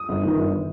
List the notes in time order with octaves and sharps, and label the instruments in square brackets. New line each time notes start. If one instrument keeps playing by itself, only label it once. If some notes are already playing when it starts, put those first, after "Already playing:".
Already playing: [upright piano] D#6
G1
D#3
G1